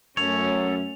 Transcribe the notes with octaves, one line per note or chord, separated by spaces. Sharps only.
F#2 A3 C#4 A4 C#5 F7